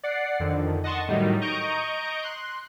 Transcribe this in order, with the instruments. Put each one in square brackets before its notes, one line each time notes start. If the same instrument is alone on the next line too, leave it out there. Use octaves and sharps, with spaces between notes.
[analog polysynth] D5 F#5 C7
F2 D3 D#3
D#5 F#5 A5 C6 C#6
A2 D#3 F#3 G3 D#4
D#5 A#5 C#6 G6 D7
C6 F#6